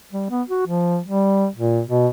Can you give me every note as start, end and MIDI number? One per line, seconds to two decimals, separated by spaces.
0.12 0.26 55
0.30 0.42 59
0.49 0.63 66
0.67 0.99 53
1.04 1.47 55
1.56 1.82 46
1.87 2.08 47